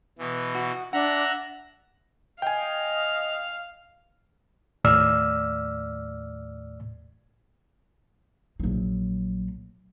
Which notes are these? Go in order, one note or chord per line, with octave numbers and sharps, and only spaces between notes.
B2 E3
F#4
D4 E5 F#5 A#5 F#6
D#5 F5 G5 G#5
D#2 A2 D5 E6 F6
A#1 F#3